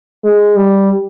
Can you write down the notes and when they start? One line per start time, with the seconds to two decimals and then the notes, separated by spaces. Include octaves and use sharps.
0.24 G#3
0.57 G3